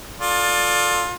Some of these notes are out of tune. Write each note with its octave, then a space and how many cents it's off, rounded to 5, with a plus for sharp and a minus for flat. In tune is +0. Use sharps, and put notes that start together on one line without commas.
F4 +25 A4 +0 D5 +0